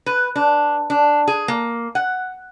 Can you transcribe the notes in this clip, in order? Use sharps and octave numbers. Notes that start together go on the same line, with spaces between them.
B4
D4
D4
G#4
A#3
F#5